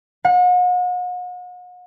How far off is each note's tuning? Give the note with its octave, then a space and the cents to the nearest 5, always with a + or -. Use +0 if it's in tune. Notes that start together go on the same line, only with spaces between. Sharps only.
F#5 -40